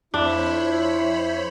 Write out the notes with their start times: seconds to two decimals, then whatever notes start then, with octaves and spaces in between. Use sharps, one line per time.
0.14 F2 D4 E4 C5 C#5 B5